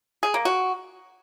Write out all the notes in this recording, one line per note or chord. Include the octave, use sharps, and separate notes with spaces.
G#4
A#3
F#4